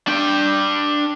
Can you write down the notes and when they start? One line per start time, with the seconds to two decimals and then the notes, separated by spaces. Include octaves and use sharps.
0.07 D4 G5